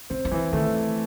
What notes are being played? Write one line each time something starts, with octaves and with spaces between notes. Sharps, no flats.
C#3 C4
D#3
D3 E3
D#3 A3